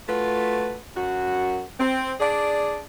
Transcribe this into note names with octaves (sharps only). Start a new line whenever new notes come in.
A3 F4 F#4 B4
F#2 F#4
C4
D4 G#4 D5